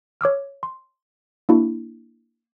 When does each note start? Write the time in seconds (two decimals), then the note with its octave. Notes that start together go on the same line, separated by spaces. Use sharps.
0.21 C#5 D6 E6 F6
0.63 C6
1.49 A#3 D4 E4 F#4